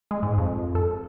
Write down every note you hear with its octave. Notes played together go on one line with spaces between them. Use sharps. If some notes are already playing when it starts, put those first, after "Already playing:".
G#3
G#2
F2
A4